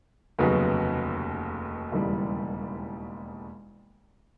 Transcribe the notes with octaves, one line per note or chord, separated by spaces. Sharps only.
F1 D#2 C#3 F#3 B3
E1 D#2 C#3 E3 G3